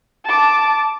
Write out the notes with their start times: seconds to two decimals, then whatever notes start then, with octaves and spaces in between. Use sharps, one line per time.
0.25 A5 D6